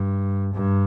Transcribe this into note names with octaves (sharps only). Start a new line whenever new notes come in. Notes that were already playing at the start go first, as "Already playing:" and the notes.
Already playing: G2
G2